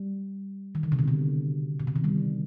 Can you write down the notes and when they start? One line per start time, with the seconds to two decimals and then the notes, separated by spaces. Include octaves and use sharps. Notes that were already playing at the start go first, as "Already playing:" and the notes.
Already playing: G3
0.75 D#3
0.83 D3
0.92 C3
0.99 B2
1.08 D3
1.80 B2
1.87 C3
1.96 D#3
2.04 G3